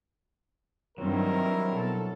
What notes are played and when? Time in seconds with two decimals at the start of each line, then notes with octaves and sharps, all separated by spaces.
0.98 G2 D#3 F#3 G3 C4 E4 A#4
1.75 B2 A4